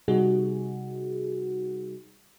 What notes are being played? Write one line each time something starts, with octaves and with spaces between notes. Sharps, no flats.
C3 G3 D#4 F#4 G#4